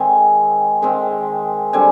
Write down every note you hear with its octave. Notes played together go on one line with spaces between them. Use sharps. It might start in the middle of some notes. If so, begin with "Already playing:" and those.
Already playing: D#3 G#3 C4 G#5
D#3 G#3 C4
D3 G3 C4 G#5